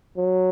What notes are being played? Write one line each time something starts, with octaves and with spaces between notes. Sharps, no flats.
F#3